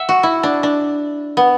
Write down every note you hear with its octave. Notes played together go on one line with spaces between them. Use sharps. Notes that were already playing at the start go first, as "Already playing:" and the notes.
Already playing: E5 F#5
F#4
E4
D4
D4
B3